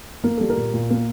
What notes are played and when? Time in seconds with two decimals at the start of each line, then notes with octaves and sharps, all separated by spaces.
0.24 A#3 A#4
0.37 G3 A4
0.50 A#4
0.57 A#2
0.74 A#2
0.90 A#3